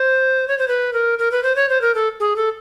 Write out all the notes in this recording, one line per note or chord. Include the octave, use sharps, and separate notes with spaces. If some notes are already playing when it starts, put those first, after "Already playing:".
Already playing: C5
C#5
C5
B4
A#4
A#4
B4
C5
C#5
C5
A#4
A4
G#4
A4